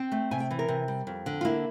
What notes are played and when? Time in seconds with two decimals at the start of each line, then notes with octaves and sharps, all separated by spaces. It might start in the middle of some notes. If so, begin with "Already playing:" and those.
Already playing: C4 G5
0.12 A3
0.31 C3 G#5
0.40 G5
0.51 E3
0.59 A#4
0.68 C3
0.88 G3
1.07 F2
1.26 D3
1.41 F4
1.45 A#3 E4